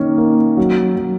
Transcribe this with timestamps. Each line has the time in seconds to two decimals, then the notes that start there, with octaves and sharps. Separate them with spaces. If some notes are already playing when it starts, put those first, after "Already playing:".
Already playing: D#3 A#3 C#4
0.18 A#3
0.57 F#3
0.96 F#3